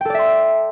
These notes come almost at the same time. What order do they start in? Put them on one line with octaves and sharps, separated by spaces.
G5 A4 D5 E5 C6